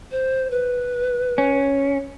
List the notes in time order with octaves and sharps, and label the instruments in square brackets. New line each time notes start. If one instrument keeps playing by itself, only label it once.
[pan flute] C5
B4
[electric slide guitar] C#4